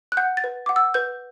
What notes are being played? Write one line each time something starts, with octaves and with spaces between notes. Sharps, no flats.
F#6
F#5 G6
A6
B4
F#5 D6
E6
B4 G6